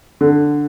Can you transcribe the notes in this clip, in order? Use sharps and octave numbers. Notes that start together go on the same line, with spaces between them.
D3